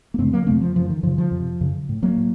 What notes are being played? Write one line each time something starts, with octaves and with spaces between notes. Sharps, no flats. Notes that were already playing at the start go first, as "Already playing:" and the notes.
A#3
F#2 C#3 A3 C4
F#3 A#3
F2 C3 A3 C4
F3
F#2 C#3 F3
D#3
F#2 C#3 F3
F3
F2
C3
F#2 C#3
A2
F#3 A#3
A2